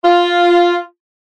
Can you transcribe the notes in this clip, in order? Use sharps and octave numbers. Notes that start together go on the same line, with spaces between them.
F4